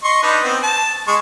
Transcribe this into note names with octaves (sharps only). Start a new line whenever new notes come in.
D#5 C6 C#6
D4 D#4 B4
B3 C4
A5
G#3 C#6